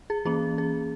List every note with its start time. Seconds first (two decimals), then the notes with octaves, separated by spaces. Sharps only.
0.10 G#4
0.25 E3 A#3 C#4 G#4
0.58 G#4